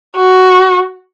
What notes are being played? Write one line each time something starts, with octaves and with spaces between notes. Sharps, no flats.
F#4